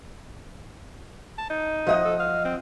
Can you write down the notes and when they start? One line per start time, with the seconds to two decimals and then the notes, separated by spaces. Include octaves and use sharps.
1.38 A5
1.50 D#4
1.87 F3 D#5 F#5
2.05 A4
2.19 F5
2.45 C4